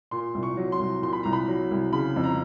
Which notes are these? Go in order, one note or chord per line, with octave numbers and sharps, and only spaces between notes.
A#2 C6
C2
C#6
F#3
C6
C2
A#2 C6
B5
C2 A#5
B5
F#3
C2
C#3 B5
F2
A#5